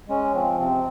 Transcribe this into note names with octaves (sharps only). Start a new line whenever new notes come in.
G#3 C#4
F3 C4
C3 C4